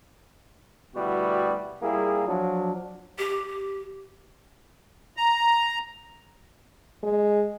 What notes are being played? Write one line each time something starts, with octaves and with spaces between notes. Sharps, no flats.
D2 B2 G3 B3 E4 F#4
A#2 G3 A#3 E4 G#4
F3 F#3 D4
G4
A#5
G#3